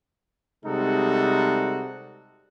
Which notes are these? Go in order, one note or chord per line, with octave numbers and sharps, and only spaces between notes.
C3 G3 G#3 D#4 F#4 A4